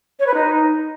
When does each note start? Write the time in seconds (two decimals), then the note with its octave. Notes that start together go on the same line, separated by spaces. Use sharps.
0.19 C#5
0.27 B4
0.34 D#4